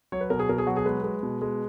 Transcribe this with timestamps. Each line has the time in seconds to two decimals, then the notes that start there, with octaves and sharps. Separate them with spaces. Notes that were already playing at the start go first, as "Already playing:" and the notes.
0.12 F#3 C#5
0.21 B4
0.30 B2 A#4
0.39 G#4
0.49 B2 A#4
0.58 G#4
0.67 F#3 F#4
0.76 G#4
0.85 G#3 B4
1.04 G#3
1.23 B2
1.42 G#3